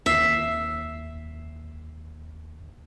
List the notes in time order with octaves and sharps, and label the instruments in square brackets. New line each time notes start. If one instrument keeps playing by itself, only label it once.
[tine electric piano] D#2 C7 [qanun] E5